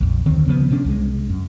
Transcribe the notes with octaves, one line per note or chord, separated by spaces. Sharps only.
A#1 F2
D2 D#3 C4
C#3 F3 B3
C3 C#4 D4
C2 G#3
F#2